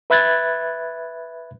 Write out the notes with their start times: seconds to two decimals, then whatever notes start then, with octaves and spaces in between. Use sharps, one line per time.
0.10 B4 E5 B5 F#6 G#6 A6